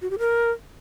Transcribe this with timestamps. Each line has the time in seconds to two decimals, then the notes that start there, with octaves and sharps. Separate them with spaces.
0.02 F#4
0.10 G4
0.19 A#4